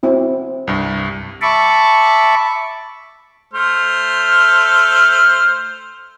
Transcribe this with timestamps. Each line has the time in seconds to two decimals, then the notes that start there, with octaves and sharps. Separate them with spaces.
0.03 C4 E4 F#4
0.67 C2 G2
1.41 E5 A5 B5 C#6 D6
3.54 A3 C5 F6